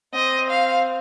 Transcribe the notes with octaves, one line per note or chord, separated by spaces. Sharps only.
C4 D#5
F5